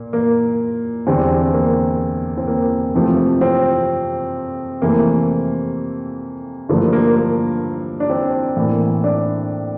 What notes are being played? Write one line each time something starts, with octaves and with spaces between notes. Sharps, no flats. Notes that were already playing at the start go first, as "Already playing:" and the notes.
Already playing: A#2 A#3
A#3
E2 D3 G3 C4
C4
A#3
C4
A#3
F2 C3 F3 A3
C4
F2 C3 E3 A3 A#3
G2 D3 F3 A3 A#3
A#3
A#3
D4
C4
A2 E3 A#3
D4